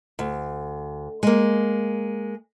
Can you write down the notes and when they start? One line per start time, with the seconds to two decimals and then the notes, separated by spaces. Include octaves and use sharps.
0.19 D2
1.23 G#3 A#3